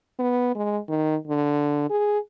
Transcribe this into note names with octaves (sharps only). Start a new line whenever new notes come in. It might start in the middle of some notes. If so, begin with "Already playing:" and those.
B3
G#3
D#3
D3
G#4